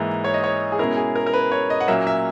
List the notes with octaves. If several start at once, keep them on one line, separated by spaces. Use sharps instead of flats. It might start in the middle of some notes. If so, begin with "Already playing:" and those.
Already playing: G#2 E3 A#3 E4
C#5
D#5
C#5
G#4
B2 G#3 C#4 E4 A#4
G#4
A#4
A#4
B4
C#5
D#5
F#5
A#2 F#3 A#3 C#4 E5
E5